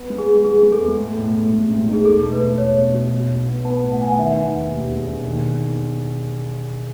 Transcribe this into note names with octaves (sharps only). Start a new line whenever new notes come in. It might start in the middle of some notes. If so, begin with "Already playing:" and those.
Already playing: B3
G#3
G#4
B3
G#3 G#4
G#3
A4
E2
A2
A2
A2
G#3
A1
D#4
G#4
E1 A4
A3
B4
E2
E1 C#5
E2
B2
B1
B1
B3
B3 A5
A2
F#5
B3 G#5
F#5
D#3 E5
D#3
E1
D#2
E1
E1
D#3